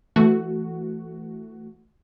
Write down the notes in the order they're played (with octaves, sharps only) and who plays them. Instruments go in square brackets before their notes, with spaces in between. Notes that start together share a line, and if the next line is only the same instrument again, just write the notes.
[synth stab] E3 A3 F#4